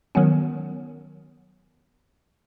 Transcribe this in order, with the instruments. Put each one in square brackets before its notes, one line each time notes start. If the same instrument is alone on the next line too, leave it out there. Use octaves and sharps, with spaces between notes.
[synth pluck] D#3 F#3 B3 C#4